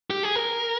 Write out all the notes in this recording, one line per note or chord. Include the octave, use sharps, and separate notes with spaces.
G4
G#4
A#4